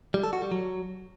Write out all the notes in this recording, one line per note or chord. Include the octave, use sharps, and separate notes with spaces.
G3
A4
F#4
G3
F#3